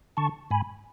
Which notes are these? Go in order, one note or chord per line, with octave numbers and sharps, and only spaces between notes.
D3 A5 C#6
G#2 G#5 B5